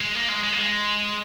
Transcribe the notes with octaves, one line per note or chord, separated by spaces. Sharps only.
G#3
A#3
G#3
G#3
A#3
G#3